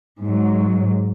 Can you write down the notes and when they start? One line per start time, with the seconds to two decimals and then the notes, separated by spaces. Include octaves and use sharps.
0.24 G#2 F#3